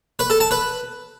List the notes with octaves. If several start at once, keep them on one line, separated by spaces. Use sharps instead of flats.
B4
A4
A5
B4